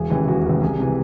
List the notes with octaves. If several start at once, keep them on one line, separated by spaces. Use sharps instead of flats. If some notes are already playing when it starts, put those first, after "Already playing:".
Already playing: E1 G#4
D#2 C#3 E3
E1 F#4
D#2 C#3 E3
C2 G#4
C3 E3